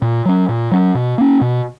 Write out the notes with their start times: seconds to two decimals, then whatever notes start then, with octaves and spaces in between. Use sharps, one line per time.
0.02 A#2
0.25 F#3 C#4
0.49 A#2
0.71 F#3 C#4
0.95 B2
1.18 A#3 C#4
1.41 B2